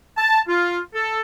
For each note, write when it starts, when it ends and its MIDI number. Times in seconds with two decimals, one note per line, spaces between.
0.17 0.39 81
0.48 0.79 65
0.94 1.21 69